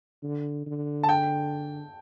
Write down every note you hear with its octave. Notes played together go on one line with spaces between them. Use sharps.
D3
D3
A5
G5